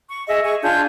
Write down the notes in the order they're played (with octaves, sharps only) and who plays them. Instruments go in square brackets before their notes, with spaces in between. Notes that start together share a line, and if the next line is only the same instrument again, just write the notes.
[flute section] C#6
G#4 D#5 E5
G#4 C#6
D4 F4 G#5 G6